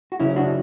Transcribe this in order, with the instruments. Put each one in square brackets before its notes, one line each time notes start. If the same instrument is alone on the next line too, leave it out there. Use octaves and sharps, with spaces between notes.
[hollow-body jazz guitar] F#4
[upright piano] F#1 F#2 C#3 [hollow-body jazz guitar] C#4 E4
[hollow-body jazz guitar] D4 F#4